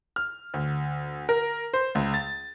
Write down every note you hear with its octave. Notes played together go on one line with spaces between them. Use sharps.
F6
D2
A#4
C5
C#2
A6